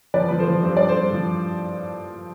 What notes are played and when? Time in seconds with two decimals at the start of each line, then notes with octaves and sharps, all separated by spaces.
0.14 F3 B4 D5
0.29 F3 B4
0.39 A4 C5
0.48 F3
0.63 G2 C5
0.77 G2 D5
0.89 A4 C5
0.97 G2
1.13 F3